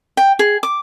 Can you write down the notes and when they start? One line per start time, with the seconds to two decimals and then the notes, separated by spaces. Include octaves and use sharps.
0.17 G5
0.39 G#4
0.63 D6